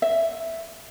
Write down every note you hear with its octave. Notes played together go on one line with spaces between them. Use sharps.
E5